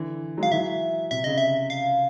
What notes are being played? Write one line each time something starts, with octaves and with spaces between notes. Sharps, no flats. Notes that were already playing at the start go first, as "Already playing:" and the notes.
Already playing: D3 E3
F#3 G#3
F5
E3 F#3 E5
C3 E5
C#3 D#5
E5
F5